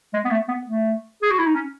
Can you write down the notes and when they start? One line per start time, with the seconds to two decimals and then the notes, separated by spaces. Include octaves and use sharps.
0.13 G#3
0.25 B3
0.31 A3
0.48 B3
0.66 A3
1.22 G#4
1.30 F#4
1.38 E4
1.46 D#4
1.55 C#4